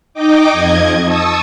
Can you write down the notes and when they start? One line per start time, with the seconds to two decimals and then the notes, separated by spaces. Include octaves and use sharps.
0.14 D#4 D#5 G5 D6
0.51 F2 D#5 G#6
1.05 A5 C#6 D#6 E6